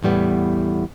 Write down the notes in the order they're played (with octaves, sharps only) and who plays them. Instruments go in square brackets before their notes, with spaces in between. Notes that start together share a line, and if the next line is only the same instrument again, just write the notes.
[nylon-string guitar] E2 A2 G3 B3